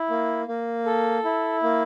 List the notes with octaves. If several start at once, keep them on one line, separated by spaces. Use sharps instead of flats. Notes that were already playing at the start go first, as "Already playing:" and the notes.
Already playing: E4
A#3
A#3
A4
E4
A#3